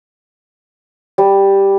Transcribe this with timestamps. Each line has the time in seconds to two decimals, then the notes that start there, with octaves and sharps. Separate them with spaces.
1.18 G3